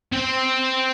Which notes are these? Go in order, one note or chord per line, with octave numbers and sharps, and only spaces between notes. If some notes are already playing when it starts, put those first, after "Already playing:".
C4